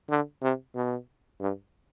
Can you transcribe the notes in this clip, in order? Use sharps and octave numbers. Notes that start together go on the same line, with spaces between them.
D3
C3
B2
G2